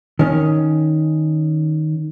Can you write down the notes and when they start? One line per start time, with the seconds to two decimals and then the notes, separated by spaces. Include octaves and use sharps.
0.19 D#3 C#4